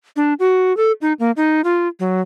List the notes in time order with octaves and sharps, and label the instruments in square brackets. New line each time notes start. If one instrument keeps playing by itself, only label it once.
[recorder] D4
F#4
A4
D#4
A#3
D#4
F4
F#3